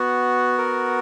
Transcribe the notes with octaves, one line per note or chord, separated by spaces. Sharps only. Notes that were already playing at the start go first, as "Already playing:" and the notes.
Already playing: B3 F#4
A#4